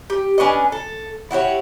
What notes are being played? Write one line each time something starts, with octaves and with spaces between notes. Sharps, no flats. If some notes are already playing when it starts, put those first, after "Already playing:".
G4
C#4 D4 B4 D#5
A4
E4 F#4 G4 C#5